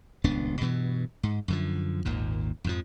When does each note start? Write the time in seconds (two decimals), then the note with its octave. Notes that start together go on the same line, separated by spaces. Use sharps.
0.24 D#1 C#2 B3 D4
0.60 G2 B2 E3
1.23 G#2
1.48 F#2 D3 F3
2.05 G#1 D#2 A#2
2.64 F2 G#2 F3